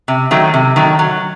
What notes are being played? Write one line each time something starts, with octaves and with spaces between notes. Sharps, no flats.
C3
D#3 F#3 A3
C3
D#3 F#3 A3
F#3